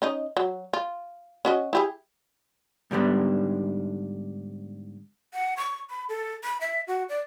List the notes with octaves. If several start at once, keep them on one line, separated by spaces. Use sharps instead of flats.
C#4 D#4 D#5
F#3
F4
C#4 F#4 D#5
E4 G4 G#4
G#2 D3 G3 B3 D4
F#5
C#6
B5
A4
B5
E5
F#4
D5